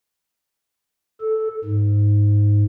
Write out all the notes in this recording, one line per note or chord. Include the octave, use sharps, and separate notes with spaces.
A4
G#2